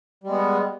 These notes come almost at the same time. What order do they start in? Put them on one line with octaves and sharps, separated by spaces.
G3 G#3 B3